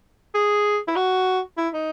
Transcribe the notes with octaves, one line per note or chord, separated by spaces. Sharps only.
G#4
E4
F#4
E4
D#4